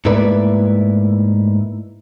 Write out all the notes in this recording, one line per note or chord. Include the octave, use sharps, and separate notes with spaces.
G#2 A3 A#3 E4 B4 D5